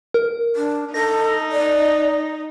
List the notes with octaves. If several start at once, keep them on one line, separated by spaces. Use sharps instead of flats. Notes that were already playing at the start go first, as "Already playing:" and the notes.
A#4
D4
D#4 A4 A#6
D5